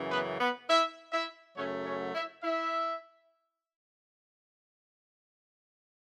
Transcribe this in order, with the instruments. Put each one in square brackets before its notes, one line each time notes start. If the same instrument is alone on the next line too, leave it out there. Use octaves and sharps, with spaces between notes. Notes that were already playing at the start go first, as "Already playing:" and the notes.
Already playing: [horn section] F#2 C#3 E3
B3 B4
B3 B4
E4 E5
E4 E5
F#2 C#3 F#3 A3 C#4 C#5
C#4 C#5
E4 E5
E4 E5